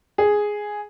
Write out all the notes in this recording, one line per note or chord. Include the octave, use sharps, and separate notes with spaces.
G#4